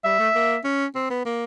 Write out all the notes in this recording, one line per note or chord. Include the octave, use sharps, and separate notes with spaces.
G3 E5
A3
A#3
C#4
C4
B3
A#3